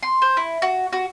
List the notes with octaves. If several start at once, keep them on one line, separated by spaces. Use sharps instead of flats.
C6
C5
E4
F#4
F#4